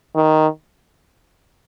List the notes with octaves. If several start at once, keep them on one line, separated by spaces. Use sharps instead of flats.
D#3